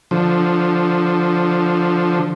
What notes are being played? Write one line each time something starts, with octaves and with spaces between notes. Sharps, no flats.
D3 F3